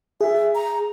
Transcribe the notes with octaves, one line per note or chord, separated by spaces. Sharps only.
G#4 E5
A#5